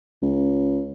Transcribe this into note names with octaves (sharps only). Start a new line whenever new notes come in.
C#2